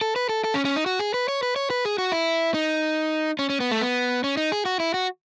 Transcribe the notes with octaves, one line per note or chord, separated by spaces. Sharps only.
A4
B4
A4
A4
C#4
C#4
D#4
F#4
G#4
B4
C#5
B4
C#5
B4
G#4
F#4
E4
D#4
C#4
C#4
B3
A3
B3
C#4
D#4
G#4
F#4
E4
F#4